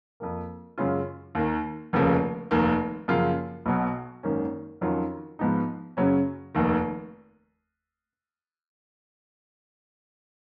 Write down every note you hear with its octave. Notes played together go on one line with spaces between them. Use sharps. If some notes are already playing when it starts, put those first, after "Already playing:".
F2 F3 A#3
F#2 C#3 G#3 C#4 F4
D#2 D#3 A#3
F1 D#2 C#3 F3 A#3
F1 D#2 D#3 A#3
F#2 C#3 F3 A#3 F4
B1 B2 F#3
G#1 F#2 D#3 A#3 C#4
F2 D#3 F#3 C#4 F4
G#2 F3 B3 D#4
F#2 C#3 F#3 C#4
F1 D#2 D#3